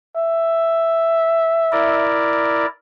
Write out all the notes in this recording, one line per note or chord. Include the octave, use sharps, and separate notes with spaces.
E5
E4 A#4 D5